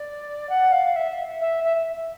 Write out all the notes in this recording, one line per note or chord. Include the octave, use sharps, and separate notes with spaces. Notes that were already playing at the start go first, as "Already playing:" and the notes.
Already playing: D5
F#5
F5
E5
E5
E5